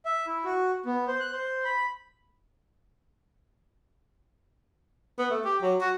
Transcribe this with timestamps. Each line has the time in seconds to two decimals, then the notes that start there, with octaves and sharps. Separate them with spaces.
0.05 E5
0.27 E4
0.44 F#4
0.86 B3
1.08 C5
1.20 F#6
1.32 C5
1.65 B5
5.19 B3
5.30 A3
5.45 G4
5.62 F#3
5.81 F#4